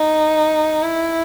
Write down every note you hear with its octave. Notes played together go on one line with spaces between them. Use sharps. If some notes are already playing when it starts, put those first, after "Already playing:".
Already playing: D#4
E4